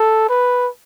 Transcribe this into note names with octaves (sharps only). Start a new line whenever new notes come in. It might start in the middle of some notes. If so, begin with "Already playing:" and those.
Already playing: A4
B4